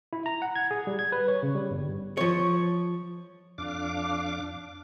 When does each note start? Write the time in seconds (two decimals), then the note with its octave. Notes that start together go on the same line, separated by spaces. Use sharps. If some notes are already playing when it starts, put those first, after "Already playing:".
0.13 E4
0.26 A#5
0.42 F#5
0.56 G#6
0.71 G#4
0.87 G3
0.99 G#6
1.12 B4
1.28 C#5
1.43 C#3
1.55 G3
1.70 G1
2.17 F3 C#5
3.58 F2 D4 F5 D6